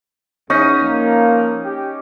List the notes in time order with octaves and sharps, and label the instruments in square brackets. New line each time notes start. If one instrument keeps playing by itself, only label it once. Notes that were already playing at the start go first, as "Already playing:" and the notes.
[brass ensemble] E2 [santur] C#4 D#4 D#6
[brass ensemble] F3 A#3
G4